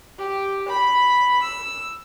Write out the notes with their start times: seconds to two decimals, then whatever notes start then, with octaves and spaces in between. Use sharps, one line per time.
0.17 G4
0.68 B5
1.42 E6